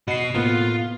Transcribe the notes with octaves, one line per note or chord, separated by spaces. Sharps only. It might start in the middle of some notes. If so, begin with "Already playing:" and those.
B2 F#4 D#5 C7
A2 C3 A#3 B3 F4